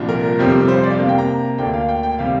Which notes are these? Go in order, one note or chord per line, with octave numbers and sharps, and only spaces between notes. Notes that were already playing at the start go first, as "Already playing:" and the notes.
Already playing: C2 A#2 F3 D4
A#4
F2 C3 G3 C4
C5
D5
C3 A#3 D4 F5
G5
A#5
D2 D3 A#3 D4 G5
F5
G5
G5
C3 G3 F5